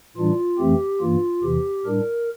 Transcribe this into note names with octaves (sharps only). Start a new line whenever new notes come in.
A2 E3 G3 D4 F4
F2 E3 A3 C4 G4
G2 E3 A#3 F4
E2 C3 E3 G4
A2 G3 D4 A#4